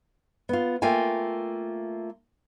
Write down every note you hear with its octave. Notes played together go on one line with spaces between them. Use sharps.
B3 F4
A3 A#3 F4 G5 G#5